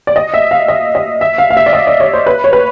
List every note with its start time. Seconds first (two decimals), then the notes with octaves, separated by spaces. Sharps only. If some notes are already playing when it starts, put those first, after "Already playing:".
0.07 D5
0.16 D#5
0.34 E5
0.51 F5
0.68 D#5
0.95 D#5
1.21 E5
1.38 F5
1.51 F5
1.57 E5
1.66 D5
1.73 D#5
1.87 D5
2.00 C#5
2.13 C5
2.27 B4
2.44 C#5
2.53 B4